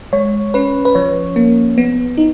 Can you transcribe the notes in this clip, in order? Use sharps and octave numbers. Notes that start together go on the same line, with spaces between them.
G#3 C#5
C#4 B4
B4
F3 C#5
A#3
B3
D#4